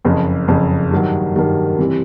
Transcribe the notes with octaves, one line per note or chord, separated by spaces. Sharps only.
F#1 F2 C#3
F#1 F2 C#3
G2 D#3 F#3
G2 D#3 F#3
C3 E3 G3 C4